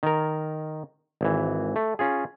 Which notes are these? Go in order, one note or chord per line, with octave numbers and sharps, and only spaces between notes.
D#3 A#4
G#1 E3
A3
C#4 F4 G#4